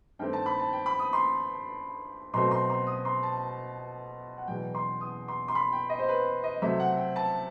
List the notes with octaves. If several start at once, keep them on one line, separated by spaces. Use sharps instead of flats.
G2 D#3 A3 C4 G5
A5
B5
A5
G5
B5
D#6
C6
B2 F#3 A3 C4 C6
C6
C6
D#6
C6
A5
F#5
E2 B2 F#3 G5
C6
D#6
C6
C6
B5
G5
D#5
C5
B4
D#5
C3 F#3 A3 C4 E5
F#5
G5
A5